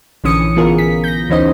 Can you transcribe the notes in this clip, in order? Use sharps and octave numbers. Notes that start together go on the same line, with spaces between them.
A#1 D3 E3 C#4 D#6 C#7
E3 B3 F4 G#4 A#4
B6
G6 A#6
D2 E3 C#4 D#4 C5 D#5